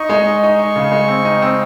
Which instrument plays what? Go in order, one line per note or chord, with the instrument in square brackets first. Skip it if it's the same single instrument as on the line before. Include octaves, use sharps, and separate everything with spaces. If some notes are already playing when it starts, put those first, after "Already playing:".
Already playing: [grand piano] D#4 [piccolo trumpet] C#6
[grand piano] G#3
D#4
[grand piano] D#4 [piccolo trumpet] C#6
[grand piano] D#4
C#3
G#3
C4
D#4
C4